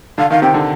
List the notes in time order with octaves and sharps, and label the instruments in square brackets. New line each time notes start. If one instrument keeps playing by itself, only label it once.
[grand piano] D3 [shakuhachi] F5
[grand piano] D#3 [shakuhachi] F5
[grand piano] C3 [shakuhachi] G5
[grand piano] D3